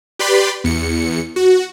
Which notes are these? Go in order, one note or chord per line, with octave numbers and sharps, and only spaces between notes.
G4 B4 D5 B5 C6
E2 C#7
F#4